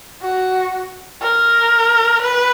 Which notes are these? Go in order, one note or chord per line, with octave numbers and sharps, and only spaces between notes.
F#4
A#4
B4